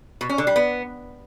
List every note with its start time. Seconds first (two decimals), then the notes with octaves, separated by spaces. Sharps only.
0.21 B2
0.30 C#4
0.38 D3
0.47 G3
0.56 B3